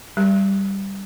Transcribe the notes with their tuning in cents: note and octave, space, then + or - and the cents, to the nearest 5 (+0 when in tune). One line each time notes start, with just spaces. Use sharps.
G3 +0 G4 +0